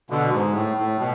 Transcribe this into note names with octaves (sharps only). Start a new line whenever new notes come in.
B2 D3
G#2
A2
A2
B2